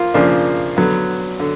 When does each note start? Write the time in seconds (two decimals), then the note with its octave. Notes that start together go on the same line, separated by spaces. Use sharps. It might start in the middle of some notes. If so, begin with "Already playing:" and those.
Already playing: F3 A#3 F4
0.14 C#3 F3 A#3 D4
0.77 D3 F#3 B3
1.40 D3